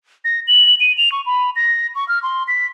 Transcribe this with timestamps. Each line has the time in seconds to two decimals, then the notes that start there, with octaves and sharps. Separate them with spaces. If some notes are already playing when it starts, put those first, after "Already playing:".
0.24 A#6
0.47 F#7
0.80 D#7
0.98 F7
1.12 C#6
1.26 B5
1.56 A#6
1.95 C#6
2.08 F6
2.23 C6
2.48 B6